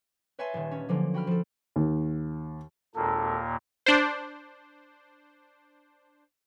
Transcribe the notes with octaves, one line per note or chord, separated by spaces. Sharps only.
B4 C#5 E5 G#5 A5 C6
D#1 D#3
C#4
D3 F3 F#3 A#3
F#4 G5 B5 F6
F3 A4
D#2
G#1 D#2 A#2 A#3 A4
D4 C5